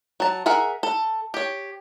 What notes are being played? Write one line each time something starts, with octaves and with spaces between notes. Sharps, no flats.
F#3 A5
G#4 A#4 E5 F#5
A4
G4 C#5